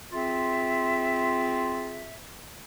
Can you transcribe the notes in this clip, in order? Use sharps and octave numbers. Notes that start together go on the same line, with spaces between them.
C4 F4 G#4 E5